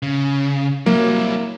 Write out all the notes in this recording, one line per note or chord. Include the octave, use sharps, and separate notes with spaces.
C#3
F#3 G3 A#3 E4